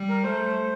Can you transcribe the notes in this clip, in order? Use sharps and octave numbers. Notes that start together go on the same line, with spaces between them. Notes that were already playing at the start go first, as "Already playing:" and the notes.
Already playing: G3
A#4
A3 C5